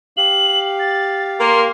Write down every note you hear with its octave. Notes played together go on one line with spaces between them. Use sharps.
G4 F5 F#7
A6
A#3 C6